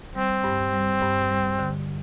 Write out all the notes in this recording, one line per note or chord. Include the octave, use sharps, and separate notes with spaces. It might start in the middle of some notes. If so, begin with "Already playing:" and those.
G3 C4
G2
G3
G2
G3
D3